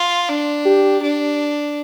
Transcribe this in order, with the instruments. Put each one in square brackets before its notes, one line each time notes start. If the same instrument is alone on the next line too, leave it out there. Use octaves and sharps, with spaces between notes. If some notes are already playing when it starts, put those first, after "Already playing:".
Already playing: [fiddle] F4
D4
[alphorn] G4
[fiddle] D4